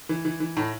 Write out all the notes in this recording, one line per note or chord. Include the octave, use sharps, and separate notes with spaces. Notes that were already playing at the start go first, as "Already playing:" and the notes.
E3
E3
E3
A2